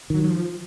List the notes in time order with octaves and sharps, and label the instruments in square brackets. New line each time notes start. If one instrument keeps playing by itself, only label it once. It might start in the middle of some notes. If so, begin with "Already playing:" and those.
[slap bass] D#3 [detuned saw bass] F#3
[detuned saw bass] F#3
F3